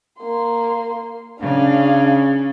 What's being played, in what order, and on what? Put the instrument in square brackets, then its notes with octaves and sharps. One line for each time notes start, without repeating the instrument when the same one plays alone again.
[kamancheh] A#3 C6
[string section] C#3 [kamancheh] D4 F5